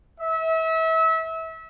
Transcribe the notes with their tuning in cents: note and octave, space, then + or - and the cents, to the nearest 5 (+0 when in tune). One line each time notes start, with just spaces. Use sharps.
E5 -30